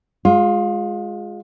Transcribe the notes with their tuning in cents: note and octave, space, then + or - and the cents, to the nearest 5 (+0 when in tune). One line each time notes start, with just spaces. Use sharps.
G#3 +0 F4 +25